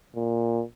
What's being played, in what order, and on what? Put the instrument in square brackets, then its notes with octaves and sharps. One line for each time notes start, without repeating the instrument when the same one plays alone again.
[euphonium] A#2